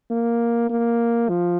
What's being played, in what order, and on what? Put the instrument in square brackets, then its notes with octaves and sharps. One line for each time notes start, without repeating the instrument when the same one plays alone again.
[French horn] A#3
A#3
F3